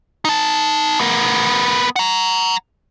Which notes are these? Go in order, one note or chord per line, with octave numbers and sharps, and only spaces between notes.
D#4 A5
B3 A#4
F#5 A#5